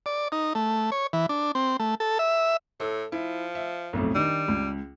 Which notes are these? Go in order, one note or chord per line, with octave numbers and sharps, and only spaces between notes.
D5
D#4
A3
C#5
E3
D4
C4
A3
A4
E5
A2 A4
F3 E4
E5
B1 F2 A2
D#3 G3 D4 D#4
C#2